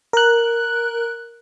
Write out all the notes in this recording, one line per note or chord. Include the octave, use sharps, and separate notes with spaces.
A#4 F#6